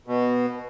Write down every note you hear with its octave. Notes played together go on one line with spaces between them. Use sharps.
B2